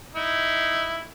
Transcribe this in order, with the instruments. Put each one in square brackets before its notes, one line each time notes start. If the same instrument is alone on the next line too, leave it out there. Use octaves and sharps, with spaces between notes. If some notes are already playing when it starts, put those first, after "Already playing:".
[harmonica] D#4 E4